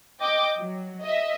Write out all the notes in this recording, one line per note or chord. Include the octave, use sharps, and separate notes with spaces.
D#5 G5 D6
F#3
D#5 E5